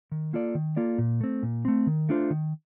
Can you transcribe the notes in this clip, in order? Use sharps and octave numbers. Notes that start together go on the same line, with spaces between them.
D#3
A#3 F4 A4 D5
D#3
A#3 F4 A4 D5
A#2
A3 C4
A#2
A3 C4
D#3
A3 D4 F4 C5
D#3